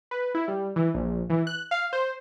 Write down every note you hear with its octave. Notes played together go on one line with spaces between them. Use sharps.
B4
E4
G3
E3
A#1
E3
F#6
F5
C5